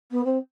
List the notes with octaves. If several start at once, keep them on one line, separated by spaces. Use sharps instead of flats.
B3
C4